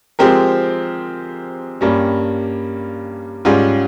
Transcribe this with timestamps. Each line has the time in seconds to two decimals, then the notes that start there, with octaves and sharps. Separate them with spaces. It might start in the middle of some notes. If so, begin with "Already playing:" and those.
0.19 F3 G#3 C4 G4 A#4
1.81 G2 G3 A#3 C#4
3.45 G#2 G3 C#4 F4